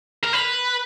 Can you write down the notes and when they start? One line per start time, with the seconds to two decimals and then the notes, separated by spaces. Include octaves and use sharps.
0.23 A#4
0.33 B4